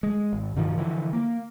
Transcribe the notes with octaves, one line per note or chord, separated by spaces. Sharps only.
G#3
G#1
G2 B2 D#3 F3
D3 E3 F3
A#3